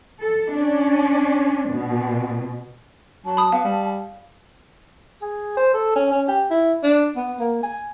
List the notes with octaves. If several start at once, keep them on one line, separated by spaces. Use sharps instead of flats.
A4
C#4 D4
B2
F#3 A5
B5 D#6
B3 F5
G3
G#4
C5
A4
C#4
C#4
G4
E4
D4
B3
A#3
G#5